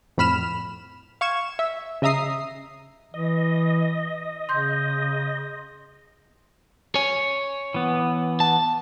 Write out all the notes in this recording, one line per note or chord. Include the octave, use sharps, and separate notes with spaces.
F2 A2 B5 F6 E7
F5 C#6 G#6 E7
E5
C#3 D#5 E5 A#5 D#6 C7
E3 D#5
C#3 C6 G6
C#5 G#5
E3 B3
A5